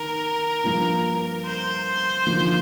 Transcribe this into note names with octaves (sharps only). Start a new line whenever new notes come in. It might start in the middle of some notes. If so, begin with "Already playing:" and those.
Already playing: D#3 A#4
G2 F3 A#3
C5
D3 F3 A#3 D#4